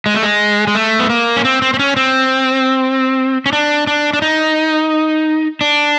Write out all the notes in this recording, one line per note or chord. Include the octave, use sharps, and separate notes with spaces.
G#3
A3
G#3
G#3
A3
B3
A#3
C#4
C4
C4
C4
C#4
C4
C#4
D4
D4
D4
D#4
D4